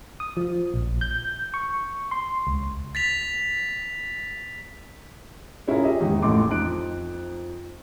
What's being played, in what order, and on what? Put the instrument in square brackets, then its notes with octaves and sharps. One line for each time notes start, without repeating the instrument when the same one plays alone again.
[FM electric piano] D#6
F3
A#1
G6
C#6
C6
C#2
[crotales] A6 B6 F7
[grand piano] C#4 E4 F4 G#4 A#4
G4 G#4 D#5 E5
E2 G#2 D#3 D#4
A1 A2 A3 G5 C6 D6
F2 D#4 F#6 D7